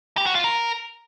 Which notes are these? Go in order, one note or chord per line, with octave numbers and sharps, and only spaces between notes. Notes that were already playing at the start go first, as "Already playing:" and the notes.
G4
F#4
F4
A#4